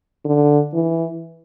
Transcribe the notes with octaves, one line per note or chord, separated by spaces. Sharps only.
D3
E3